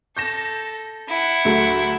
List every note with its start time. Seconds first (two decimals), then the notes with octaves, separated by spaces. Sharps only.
0.17 A4 G6 A#6 E7
1.09 E4 F#5
1.45 D2 F#3 A3